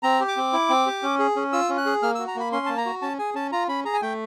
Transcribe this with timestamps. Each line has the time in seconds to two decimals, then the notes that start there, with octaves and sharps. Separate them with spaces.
0.03 C4 A#5
0.20 G4
0.28 D6
0.36 C4
0.53 E4
0.69 C4
0.86 G4
1.03 C#4
1.19 G#4
1.36 C#4
1.52 F4 E6
1.69 C#4
1.78 F#6
1.86 G#4
2.02 A#3 F6
2.15 E6
2.19 F#4
2.28 A#5
2.35 A#3 B5
2.52 C#4 C6
2.66 A#3 A5
2.77 A#5
2.86 F#4
3.02 C#4 A5
3.19 G#4 G#5
3.35 C#4 A5
3.52 F4 A#5
3.68 C#4 B5
3.85 G#4 A#5
3.94 G#5
4.02 A3 G5